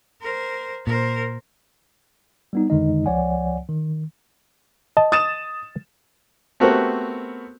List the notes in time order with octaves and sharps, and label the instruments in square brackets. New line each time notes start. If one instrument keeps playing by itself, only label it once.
[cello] A#4 C5
[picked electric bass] A#2 [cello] A#4 C5
[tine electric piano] G3 B3 D#4
F2 D3 D#3 G#3 D#4 D#5
C#2 F3 C#5 D5 F#5 G#5
D#3
[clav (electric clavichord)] D#5 A5
[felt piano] D#6 A6 E7
[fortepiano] A3 B3 C4 F#4 G4 A#4